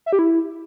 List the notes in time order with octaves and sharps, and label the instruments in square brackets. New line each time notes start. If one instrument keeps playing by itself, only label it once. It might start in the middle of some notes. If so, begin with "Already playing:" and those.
[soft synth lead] E5
G4
E4